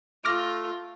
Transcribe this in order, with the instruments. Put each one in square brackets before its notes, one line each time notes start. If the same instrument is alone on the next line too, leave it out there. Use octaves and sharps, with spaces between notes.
[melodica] A3 [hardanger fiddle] F4 [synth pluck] D6 F6 A#6